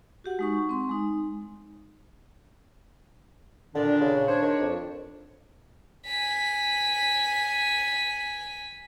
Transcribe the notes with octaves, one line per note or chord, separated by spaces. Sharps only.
F#4 G4 F#5
G#3 D#4 C#6
C4 C6
G#3 D#4
A#2 D3 D#3 D4
C#3
D4 C5 C#5
D#3
F2
G#5 B6